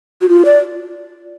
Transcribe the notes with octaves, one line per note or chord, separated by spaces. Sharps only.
F#4
F4
D5